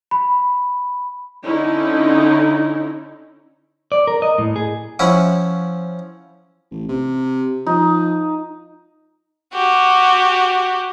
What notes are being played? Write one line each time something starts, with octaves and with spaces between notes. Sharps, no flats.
B5
D3 C#4 D#4 E4
D5
A#4
D#5
A2
G#4
F3 C#4 E4 F#5
A1
C3
F3 D#4
F#4 G4